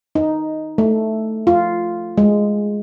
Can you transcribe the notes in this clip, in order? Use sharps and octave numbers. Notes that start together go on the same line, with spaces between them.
D#4
A3
F4
G#3